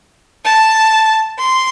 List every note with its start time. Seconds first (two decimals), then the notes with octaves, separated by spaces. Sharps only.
0.44 A5
1.39 C6